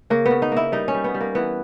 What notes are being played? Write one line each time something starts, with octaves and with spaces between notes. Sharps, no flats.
C#3 A#3
B3
C#3
D#4
A#3 E4
G3 D#4
C#4
G3
B3
G3
A#3
E3 B3